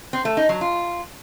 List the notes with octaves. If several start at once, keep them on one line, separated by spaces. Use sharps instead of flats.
C4
A3
D#4
F#3
F4